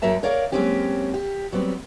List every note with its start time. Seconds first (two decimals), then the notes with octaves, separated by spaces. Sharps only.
0.02 F#2 F#3 A#4 E5 A5
0.23 A#4 C#5 D5 F5
0.52 F#3 G#3 A#3 C4 C#4 G4
1.14 G4
1.52 F#3 G3 B3 C4